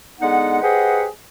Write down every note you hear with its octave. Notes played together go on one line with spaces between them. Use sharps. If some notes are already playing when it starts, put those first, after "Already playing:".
D3 G#3 B3 D#4 F#5
G4 G#4 B4 C5 D#5 F#5